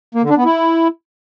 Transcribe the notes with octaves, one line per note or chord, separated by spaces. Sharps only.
A#3
D3
D4
B3
E4